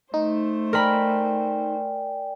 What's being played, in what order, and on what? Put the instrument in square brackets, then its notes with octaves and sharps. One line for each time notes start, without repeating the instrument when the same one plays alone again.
[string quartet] A3 C5 [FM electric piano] D#4
[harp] A#4 B5 [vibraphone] D5 G5 G#5